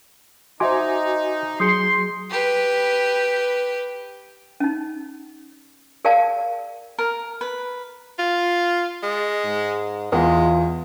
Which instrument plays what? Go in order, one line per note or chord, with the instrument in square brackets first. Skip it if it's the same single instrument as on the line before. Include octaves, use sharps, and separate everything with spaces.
[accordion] D#4 [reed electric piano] F#4 G#5 D6 [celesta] C5 E5 C6
[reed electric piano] F#3 G#4 [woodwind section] C6 [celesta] D#6 G6 C#7
[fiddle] G4 B4
[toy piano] C#4 D#4
G#4 A#4 D5 F5 G5 A5
[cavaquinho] A#4
B4
[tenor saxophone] F4
G#3
[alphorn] G#2
[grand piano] E2 [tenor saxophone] G#3 [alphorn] F4